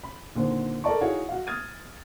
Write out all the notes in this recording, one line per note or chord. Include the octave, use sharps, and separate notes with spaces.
B5
A#2 D3 D#3 C4
A4 A#4 D5 A5 C#6
D#4 E4 F#4 G#4 C#5 F5
F#4 F5
D#6 F6 G#6 A6 D#7